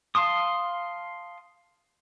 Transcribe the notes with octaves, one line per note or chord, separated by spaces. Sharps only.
F5 A5 C6 D#6